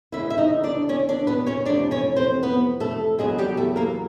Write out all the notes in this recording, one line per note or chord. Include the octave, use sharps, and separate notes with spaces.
D2 C#3 E3 E4 E5
E5
D#4 D#5
D4 D5
C#4 C#5
D4 D5
B3 B4
C#4 C#5
F2 C3 E3 A3 C4 D4 D5
C#4 C#5
C4 C5
B3 B4
A3 A4
E2 C#3 F#3 G#3 B3 G#4
G3 G4
A3 A4
A#3 A#4